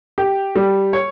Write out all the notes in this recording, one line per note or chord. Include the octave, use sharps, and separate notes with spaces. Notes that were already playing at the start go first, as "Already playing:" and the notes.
G4
G3
C#5